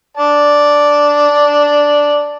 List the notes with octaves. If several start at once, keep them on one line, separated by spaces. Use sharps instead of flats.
D5 A5